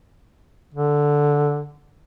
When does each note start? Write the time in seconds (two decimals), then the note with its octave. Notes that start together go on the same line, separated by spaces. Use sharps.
0.74 D3